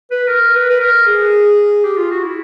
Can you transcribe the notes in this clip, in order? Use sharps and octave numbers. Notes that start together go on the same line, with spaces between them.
B4
A#4
B4
B4
A#4
G#4
G4
F4
F#4
E4